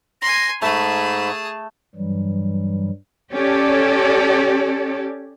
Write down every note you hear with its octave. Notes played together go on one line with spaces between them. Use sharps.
G#5 C6 A#6
G#2 A3 G#4 A5 B5
G2 E3 F#3 G3
C#4 G4 A4 C#5 D5